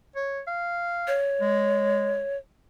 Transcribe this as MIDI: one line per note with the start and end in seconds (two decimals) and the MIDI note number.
0.16 0.41 73
0.47 1.18 77
1.08 2.37 73
1.41 2.24 56